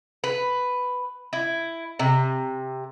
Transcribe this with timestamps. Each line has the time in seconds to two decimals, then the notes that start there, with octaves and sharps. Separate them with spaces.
0.24 B4
1.33 E4
1.99 C3